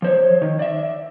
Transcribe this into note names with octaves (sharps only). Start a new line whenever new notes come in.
F3 C5 C#5
D#3
D5 E5